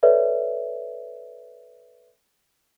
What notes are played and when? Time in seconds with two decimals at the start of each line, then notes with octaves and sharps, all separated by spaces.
0.03 A4 B4 C#5 D5 E5